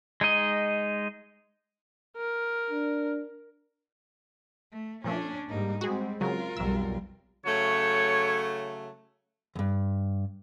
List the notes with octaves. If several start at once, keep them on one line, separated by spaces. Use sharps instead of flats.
G#3 D#4 D#5
A#4
D4
A3
A#2 F3 A3 C#4 D4
G#2 G3 A#3 D#4
G3 G#3 C4 F#4 G#4
C#3 F#3 F4 A#4
B1 F2 G3 E6
C#3 F#3 A3 C#5
E2 G2